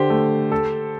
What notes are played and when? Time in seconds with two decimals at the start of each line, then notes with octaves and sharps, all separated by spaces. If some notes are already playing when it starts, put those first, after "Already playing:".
Already playing: D3 G4 C5
0.10 A3
0.52 A4